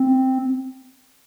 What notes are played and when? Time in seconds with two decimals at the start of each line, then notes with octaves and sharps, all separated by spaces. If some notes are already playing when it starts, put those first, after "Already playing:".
Already playing: C4